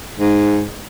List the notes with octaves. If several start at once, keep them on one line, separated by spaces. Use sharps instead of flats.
G#2